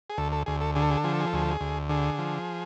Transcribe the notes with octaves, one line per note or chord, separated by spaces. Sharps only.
G#4
D2 A4
A4
D2 G#4
A4
D3 G#4
A4
G#4
A4
F3 G#4
A4
G#4
A4
D2 G#4
A4
G#4
D2
D3 G#4
F3